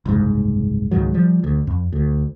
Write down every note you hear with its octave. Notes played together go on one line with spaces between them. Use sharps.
F#1 C2 G#2
C#2 G#2 D#3 F#3
F3 G3
D2
F2
D2